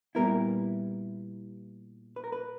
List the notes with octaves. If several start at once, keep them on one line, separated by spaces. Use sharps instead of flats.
A#2 G3 B3 E4 A#4
B4
A#4
B4